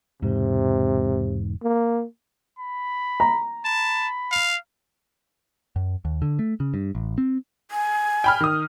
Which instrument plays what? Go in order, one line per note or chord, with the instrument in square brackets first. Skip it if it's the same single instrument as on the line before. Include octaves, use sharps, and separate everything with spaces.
[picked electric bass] E1 G#2 [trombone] C3
[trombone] A#3
[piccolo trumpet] B5
[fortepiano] A#5
[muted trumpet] A5 [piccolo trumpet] B5
[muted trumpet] F5
[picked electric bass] F#2
D#2
D3
A3
C#3
G2
A1
C4
[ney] G#5
[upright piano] G5 B5 F6
D#3 D#6